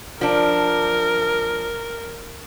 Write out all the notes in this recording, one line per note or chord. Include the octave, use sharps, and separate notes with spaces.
F3 D4 A#4